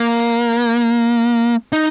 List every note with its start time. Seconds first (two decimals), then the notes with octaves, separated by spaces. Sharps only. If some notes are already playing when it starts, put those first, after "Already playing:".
Already playing: A#3
1.73 D#4